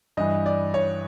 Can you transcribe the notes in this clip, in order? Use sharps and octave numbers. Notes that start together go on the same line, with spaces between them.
G2 E3 D#5
D5
C#5